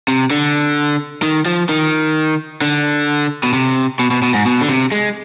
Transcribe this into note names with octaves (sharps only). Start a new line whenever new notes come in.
C3
D3
D#3
F3
D#3
D3
B2
C3
B2
B2
B2
G#2
B2
D3
C3
G#3